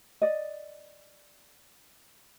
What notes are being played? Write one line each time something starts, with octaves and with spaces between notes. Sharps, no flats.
D5 D#5